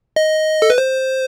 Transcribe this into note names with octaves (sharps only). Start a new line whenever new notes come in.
D#5
A4
B4
C5